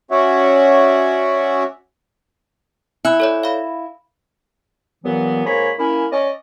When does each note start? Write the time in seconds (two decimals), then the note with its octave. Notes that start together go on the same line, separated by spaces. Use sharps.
0.11 C#4 F#4 C#5 D5 E5 F#5
3.05 E4 G#5 F#6
3.20 A4 C#5 D5
3.43 F5 B5
5.05 G2 A#2 E3 F#3 B3
5.46 G#2 A#3 C#5 G#5 A#5 B5
5.79 A#3 C#4 E4
6.12 C#4 D5 D#5